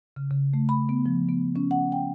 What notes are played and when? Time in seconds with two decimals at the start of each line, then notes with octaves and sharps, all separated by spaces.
0.16 C#3
0.31 C#3
0.54 A3
0.69 B5
0.89 B3
1.06 F3
1.29 B3
1.56 C#4
1.71 F#5
1.92 G5